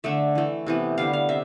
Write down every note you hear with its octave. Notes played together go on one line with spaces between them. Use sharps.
D3 A3 E5
E3 A3
C3 E3 B3
D3 G3 B3 F5
F5
C3 E5